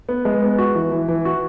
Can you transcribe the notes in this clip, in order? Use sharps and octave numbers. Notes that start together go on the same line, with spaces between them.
B3
G#3
B3
F#4
E3
E3
E3
F#4